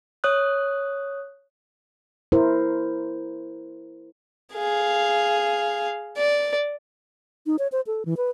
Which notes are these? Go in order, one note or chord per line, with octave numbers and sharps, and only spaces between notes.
C#5 D#6 F#6
E4 A#4 C5
G#4 F5
D5
D#4
C#5
C5
A4
E3
B4